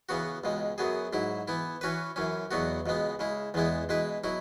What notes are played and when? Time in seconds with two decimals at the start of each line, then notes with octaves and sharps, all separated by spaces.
0.09 C#3 E3 B3 F#4
0.44 C#2 B2 G#3
0.78 F#2 F#3 B3 G#4
1.13 G#2 F#3 E4
1.48 E3 B3 E4
1.81 E3 C#4 F#4 B4
2.16 F#2 E3 C#4
2.51 E2 B2 F#3 B3 F#4
2.86 C#2 B2 G#3 B3
3.19 C#3 G#3 E4
3.54 E2 E3 G#3 B3 E4
3.89 B2 G#3 E4 B4
4.24 B2 F#3 E4